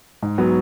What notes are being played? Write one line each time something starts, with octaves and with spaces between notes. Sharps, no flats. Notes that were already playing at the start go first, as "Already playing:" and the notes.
G#2
F#3 B3 F#4